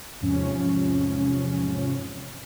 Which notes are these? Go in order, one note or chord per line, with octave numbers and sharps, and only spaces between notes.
E2 G#2 C3 F3 C#4